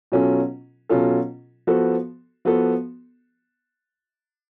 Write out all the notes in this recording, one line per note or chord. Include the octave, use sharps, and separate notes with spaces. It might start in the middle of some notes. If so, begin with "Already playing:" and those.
B2 F#3 C#4 F4 A4
B2 F#3 C#4 F4 A4
F3 B3 F#4 A4
F3 B3 F#4 A4